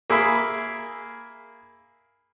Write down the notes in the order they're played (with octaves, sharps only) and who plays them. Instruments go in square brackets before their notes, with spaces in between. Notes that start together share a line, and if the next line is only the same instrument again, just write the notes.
[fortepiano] A#3 G#4 E5 B5